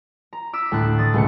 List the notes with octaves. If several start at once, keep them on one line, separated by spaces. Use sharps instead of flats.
A#5
D6 E6 B6
D2 A2 A3 D4 F#6
D3 D#6 A6
C#2 B2 A3 C#7